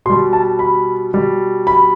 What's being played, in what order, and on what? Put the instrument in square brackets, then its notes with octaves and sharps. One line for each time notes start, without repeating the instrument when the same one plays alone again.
[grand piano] B2 C6
G3
A5
B5
B2 G3
B5